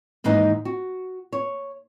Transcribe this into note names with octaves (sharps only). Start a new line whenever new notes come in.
D#2 G#2 E3 D#4 D#5
F#4
C#5